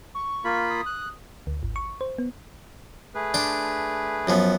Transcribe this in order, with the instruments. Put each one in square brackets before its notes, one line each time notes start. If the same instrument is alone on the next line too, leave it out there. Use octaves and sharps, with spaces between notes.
[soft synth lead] C#6
[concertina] A#3 F4 B5
[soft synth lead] D#6
[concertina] F#6
[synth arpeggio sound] D2
G#1
C#6
C5
B3
[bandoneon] A3 G#4 B4
[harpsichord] D4 C6 D6
F#2 F3 B3